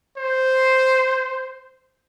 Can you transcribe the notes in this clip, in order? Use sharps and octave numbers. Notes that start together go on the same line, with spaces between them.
C5